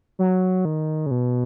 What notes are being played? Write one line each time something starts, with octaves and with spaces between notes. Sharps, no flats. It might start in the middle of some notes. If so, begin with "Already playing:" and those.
F#3
D#3
C#3
B2